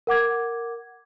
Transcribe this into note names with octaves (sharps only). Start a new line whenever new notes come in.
A#4 F#5 D6 G#6